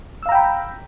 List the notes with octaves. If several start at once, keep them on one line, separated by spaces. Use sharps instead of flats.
F5 G5 A#5 B5 E6